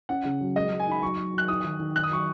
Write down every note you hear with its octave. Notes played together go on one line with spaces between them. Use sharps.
C#4 F#5
C#3
F#3
G#3 D#5
G#3
G#5
D#4 B5
F#3 C#6
F#3
F#3 F#6
D#4 D#6
D#3
D#3
D#3 F#6
D#6
F#3 C#6